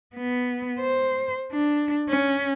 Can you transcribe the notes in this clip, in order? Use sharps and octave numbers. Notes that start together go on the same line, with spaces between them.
B3
C5
D4
C#4